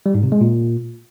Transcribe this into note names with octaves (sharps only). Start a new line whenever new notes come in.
G3
G#2
C3
G#3
A#2